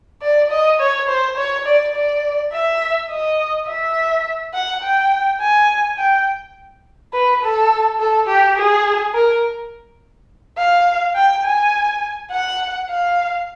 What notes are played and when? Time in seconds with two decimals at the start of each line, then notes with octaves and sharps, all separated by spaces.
0.22 D5
0.50 D#5
0.80 C#5
1.08 C5
1.37 C#5
1.66 D5
1.95 D5
2.52 E5
3.10 D#5
3.67 E5
4.54 F#5
4.83 G5
5.41 G#5
5.98 G5
7.13 B4
7.42 A4
8.00 A4
8.27 G4
8.56 G#4
9.14 A#4
10.58 F5
11.15 G5
11.45 G#5
12.31 F#5
12.89 F5